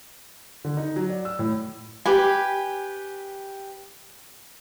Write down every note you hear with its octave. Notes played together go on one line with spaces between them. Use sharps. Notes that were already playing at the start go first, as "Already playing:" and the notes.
D3
D#4
F#3
D5
E6
A2
G4 B4 G#5